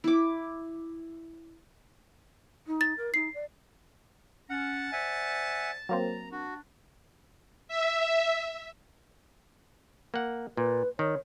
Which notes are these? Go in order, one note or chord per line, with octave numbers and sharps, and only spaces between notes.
E4 D6
D#4
A6
A#4
D#4 C7
D5
C#4 F#5 A5
C5 D5 E5 F#5 G#5
F#3 A#3 C4 A#5
D4 F#4
E5
A#3 F#5
A#2 B4
D#3 C#5